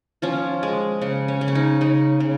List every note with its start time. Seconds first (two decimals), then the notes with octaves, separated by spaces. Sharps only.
0.22 F3 C#4 F4
0.63 G#3
1.01 C#3
1.28 C#4
1.41 C#3
1.48 C#4
1.55 D#4
1.81 C#3 D#4
2.20 C#3